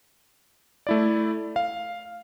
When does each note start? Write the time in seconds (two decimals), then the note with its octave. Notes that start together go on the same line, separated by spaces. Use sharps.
0.87 A3 E4 D5
1.56 F5